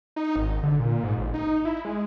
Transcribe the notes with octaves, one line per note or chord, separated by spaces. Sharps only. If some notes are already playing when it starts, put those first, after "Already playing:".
D#4
G#1
D3
A#2
G#2
A1
D#4
E4
G#3